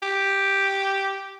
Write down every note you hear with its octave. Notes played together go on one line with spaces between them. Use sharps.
G4